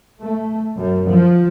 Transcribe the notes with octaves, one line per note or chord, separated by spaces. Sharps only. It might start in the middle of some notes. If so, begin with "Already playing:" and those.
A3
F#2
F3